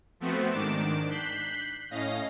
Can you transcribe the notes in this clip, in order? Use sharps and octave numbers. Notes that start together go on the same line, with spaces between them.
F3 A3 B3 C4 F#4
G#2 D#3 D4 D6 E7
F#6 G6 B6 C7
A2 C#4 D#5 F5 A#6